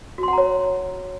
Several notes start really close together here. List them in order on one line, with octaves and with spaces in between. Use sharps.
F#4 C6 F#5 A#5 C#5